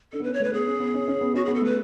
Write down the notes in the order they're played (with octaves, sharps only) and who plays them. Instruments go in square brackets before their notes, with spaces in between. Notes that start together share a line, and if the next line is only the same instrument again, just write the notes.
[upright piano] D4 [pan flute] A4
[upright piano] B3
[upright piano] C#4 [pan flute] B4
[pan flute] C#5
[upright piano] A3 [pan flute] B4
[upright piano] B3 [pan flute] G#4
[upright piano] C#4
B3
C#4
C#4
B3
[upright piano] C#4 [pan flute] F#4
[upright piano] B3 [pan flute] G#4
[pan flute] A4
[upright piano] A3 [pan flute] B4